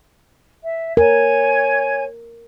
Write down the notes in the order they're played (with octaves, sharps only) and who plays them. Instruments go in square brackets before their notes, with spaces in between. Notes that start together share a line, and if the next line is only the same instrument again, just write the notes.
[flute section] E5
[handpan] A#4 [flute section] C#5 G#5 G#6